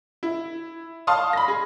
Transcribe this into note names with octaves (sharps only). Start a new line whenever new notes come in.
E4
F5 A5 C6 D#6
B5 A#6
G#4